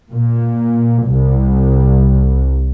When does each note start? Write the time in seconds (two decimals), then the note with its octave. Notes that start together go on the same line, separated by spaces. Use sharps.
0.14 A#2
1.07 C2